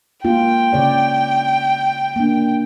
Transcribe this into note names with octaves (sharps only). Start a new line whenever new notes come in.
G#3 A#3 F4 G5
C#3 C#5 D5
A#3 D4